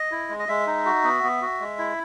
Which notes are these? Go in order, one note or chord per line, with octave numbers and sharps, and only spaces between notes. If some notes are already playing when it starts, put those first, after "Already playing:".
Already playing: D#5
E4
G#3
D#5
G#3 E5
D#4
F#4
B3
B3
F#4
G#3
E4